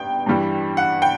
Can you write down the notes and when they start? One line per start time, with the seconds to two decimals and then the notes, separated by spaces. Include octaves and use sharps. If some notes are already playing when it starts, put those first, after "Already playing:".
Already playing: G1 G2 B3 G5
0.26 G2 E3 G3
0.77 F#5
1.02 G5